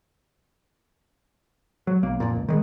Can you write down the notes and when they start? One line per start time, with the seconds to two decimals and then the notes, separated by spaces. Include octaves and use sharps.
1.87 F#3
2.03 B1 A#3
2.20 F2 A#2
2.35 C#2
2.48 D#3 G3 G#3